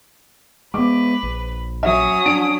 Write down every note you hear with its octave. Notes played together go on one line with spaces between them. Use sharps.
G#3 B3 B4 D6
A#1
F#3 C#4 E5 D#6
D4 D7